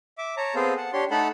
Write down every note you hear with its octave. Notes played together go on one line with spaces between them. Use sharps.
E5 D6
C#5 A5 A#5
B3 C4 G#4 A4 C5 F5
F#5 A5
D4 G4 C#5 C6
A3 D#4 A4 F#5 A5 B5